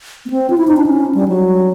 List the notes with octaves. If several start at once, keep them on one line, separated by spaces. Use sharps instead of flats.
B3
C4
F4
E4
D#4
D4
C#4
G3
F#3